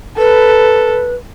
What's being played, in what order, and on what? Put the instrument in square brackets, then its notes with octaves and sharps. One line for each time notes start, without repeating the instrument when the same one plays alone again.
[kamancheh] A4 [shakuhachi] B4